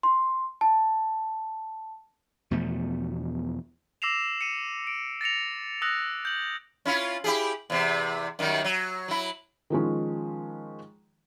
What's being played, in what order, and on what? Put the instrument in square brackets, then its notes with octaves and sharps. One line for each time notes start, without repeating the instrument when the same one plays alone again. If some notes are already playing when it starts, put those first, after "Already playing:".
[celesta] C6
A5
[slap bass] E2 B2 F3 A3
[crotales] D6 E6 A#6 C7 E7 F7
C#7 D#7
D7
A6 A#6 C#7 F7
D#6 E6 F#6 A#6 F7
G6 F#7
[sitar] C#4 E4 F4
E4 G4 G#4
E2 C3
F#2 D#3 G3
F#3
F#3 E4
[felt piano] D#3 F3 G#3 C#4